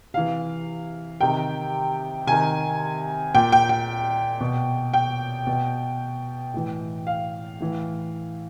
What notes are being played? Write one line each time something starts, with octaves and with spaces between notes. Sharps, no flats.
C3 E3 F5
C3 D#3 G5
C3 D#3 G#5
A#2 G5
G5
G5
B2
G5
B2
A2 E3
F5
A2 E3